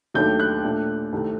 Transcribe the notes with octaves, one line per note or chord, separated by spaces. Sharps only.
D#2 D#3 F#3 A3 D4 G6
F#6
A#2 A3 D4
C2 C3 D#3 A3